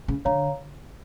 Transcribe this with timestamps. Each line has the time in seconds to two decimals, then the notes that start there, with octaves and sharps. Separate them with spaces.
0.08 C#3
0.25 D3 C#5 F5 A#5